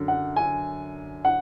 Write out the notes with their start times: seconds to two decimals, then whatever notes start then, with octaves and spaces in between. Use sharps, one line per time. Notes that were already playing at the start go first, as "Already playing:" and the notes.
Already playing: F#2 D3
0.08 F#5
0.36 G#5
1.25 F#5